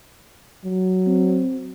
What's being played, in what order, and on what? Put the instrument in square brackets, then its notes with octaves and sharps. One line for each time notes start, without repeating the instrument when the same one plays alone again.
[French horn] F#3
[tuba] C4